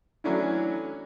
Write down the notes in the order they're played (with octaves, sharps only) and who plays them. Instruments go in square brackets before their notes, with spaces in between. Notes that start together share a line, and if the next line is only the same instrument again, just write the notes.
[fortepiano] E3 F#3 A3 C#4 D4 E4